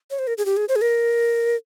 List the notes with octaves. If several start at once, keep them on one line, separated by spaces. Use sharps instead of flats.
C#5
C5
A#4
G#4
G4
G#4
C5
G#4
A#4